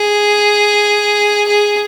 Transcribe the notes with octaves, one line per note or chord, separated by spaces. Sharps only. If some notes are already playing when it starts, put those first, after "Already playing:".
Already playing: G#4
G#4